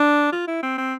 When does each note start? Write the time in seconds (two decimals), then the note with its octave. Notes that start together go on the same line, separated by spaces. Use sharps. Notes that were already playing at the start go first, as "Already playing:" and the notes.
Already playing: D4
0.32 F4
0.47 E4
0.63 C4
0.78 C4